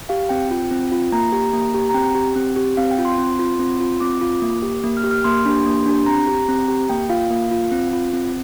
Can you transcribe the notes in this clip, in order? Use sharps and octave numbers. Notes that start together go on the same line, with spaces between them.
G4 F5
C4 G5
F4
C4
F4
A#3 A#5
G4
A#3
G4
A#5
C4 G5
G4
C4
G4
C4 F5
G5
F4
C6
C4
F4
C4
F4
C4 D6
F4
A#3
G4
A#3
F6
G4
F6
A#3 C6
D4 G4
A#3
D4 G4
C4 A#5
G4
C4
G4
A#3 G5
F4 F5
A#3
F4
C4
F4
C4